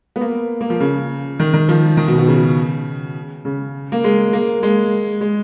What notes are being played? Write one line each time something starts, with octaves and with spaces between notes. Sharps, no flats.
B3
A#3
A#3
F3
C#3
D#3
D#3
F3
D#3
B2
B2
C#3
C#3
A#3
G#3
A#3
G#3
G#3